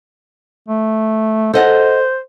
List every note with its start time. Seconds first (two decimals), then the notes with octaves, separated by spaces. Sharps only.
0.68 A3
1.54 A4 C5 D#5 F#5